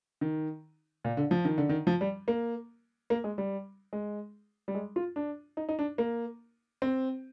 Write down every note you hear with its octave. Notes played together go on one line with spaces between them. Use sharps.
D#3
A#2
D3
F3
D#3
D3
D#3
F3
G3
A#3
A#3
G#3
G3
G#3
G3
G#3
F4
D4
D#4
D#4
D4
A#3
C4